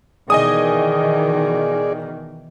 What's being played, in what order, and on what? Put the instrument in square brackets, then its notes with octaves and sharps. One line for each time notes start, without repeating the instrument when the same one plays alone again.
[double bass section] B2 D#3 E3 [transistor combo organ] G#4 D5 [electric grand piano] D#5 G#5 D#6